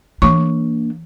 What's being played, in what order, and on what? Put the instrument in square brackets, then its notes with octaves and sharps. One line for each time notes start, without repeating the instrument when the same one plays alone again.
[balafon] E3 C#6 [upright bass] A#3 D4